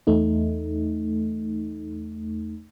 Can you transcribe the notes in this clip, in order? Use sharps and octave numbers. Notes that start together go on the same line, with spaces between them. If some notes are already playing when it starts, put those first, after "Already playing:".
E2 A3 D#4